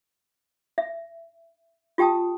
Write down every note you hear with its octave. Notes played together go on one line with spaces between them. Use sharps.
E5
F4 G4 G5 A5 D#6